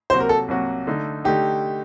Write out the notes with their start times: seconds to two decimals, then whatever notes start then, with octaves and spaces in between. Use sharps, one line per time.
0.10 C2 C3 F#3 A#3 F#4 C5
0.20 A#4
0.29 A4
0.48 C2 C3 F#3 A#3 F#4
0.87 D3 A3 D#4
1.24 D3 A3 D#4 G4